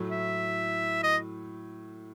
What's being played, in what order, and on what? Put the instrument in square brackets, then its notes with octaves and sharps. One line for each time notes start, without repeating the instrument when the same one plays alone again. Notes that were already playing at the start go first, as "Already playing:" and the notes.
Already playing: [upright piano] A2 F#3 A3
[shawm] E5
D#5